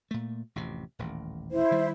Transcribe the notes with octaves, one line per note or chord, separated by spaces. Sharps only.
A#2 A3
A1 F2 C3
D#1 A1 D#2
E4 C5
D#3 G3